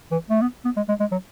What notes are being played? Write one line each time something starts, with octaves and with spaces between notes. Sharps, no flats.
E3
A3
B3
B3
G#3
G#3
G#3
F#3